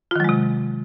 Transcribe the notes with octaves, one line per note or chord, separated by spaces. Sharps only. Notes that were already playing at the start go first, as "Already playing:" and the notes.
C3 D#3 F#3 G#3 F4